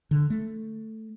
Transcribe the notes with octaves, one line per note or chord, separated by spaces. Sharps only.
D3
A3